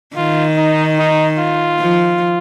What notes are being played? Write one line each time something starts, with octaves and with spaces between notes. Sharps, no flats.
D#3 F4
D#4
D#4
F4
F3